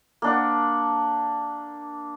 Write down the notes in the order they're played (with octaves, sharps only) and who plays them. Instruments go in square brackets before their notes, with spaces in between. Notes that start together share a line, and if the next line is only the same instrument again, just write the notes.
[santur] A#3 D4 F#5